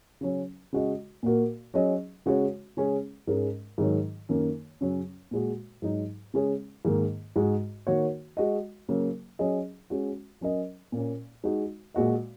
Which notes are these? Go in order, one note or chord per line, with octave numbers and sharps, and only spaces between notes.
C#3 F#3 C#4
C#3 G#3 F#4 D#5
A#2 A#3 F#4 A#4
F#3 C#4 G#4 D#5
C#3 G#3 F#4 C#5
C#3 G#3 C#4 G#4
G#2 G#3 C#4 A#4
G#2 D#3 F#3
F#2 D#3 A#3
F#2 C#3 F#3 C#4
A#2 G#3 F#4
G#2 F#3 D#4
C#3 G#3 C#4 G#4
G#2 D#3 A#3
G#2 G#3 F#4
D#3 A#3 F#4 C#5
G#3 F#4 D#5
C#3 F#3 A#3
F#3 C#4 G#4 D#5
G#3 C#4 F#4
F#3 C#4 A#4 D#5
A#2 A#3 C#4
G#3 D#4 F#4
A#2 G#3 F#4 D#5